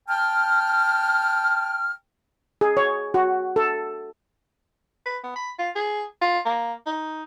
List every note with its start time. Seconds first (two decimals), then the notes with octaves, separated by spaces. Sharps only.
0.08 G5 A5 F6
2.61 G#4
2.77 C#5
3.14 F#4
3.56 A4
5.05 B4
5.24 B3
5.36 B5
5.59 F4
5.75 G#4
6.21 F4
6.45 A#3
6.86 D#4